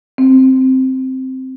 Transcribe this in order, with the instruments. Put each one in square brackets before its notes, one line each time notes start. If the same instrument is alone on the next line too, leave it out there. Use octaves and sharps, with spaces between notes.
[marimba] C4